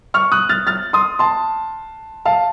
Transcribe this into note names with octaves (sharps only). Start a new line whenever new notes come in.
C#6 F6
D#6 F#6
F6 A6
F6 A6
C6 D#6
A5 C6
F5 A5